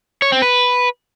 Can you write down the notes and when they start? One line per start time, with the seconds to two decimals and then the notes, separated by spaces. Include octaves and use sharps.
0.22 C#5
0.32 C4
0.42 B4